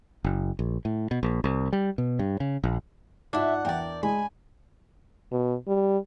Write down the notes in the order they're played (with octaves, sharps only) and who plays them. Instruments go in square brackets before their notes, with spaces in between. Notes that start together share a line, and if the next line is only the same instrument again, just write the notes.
[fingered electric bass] F#1
A#1
A2
B2
A#1
C2
G3
B2
G2
C#3
A#1
[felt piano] G#2 F4 [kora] D4 [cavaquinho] E4 E5 [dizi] F#5
[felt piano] E2 E5 G5 [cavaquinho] A#4 D5
[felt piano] G#3 [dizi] G#5 [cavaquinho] B5
[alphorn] B2
G3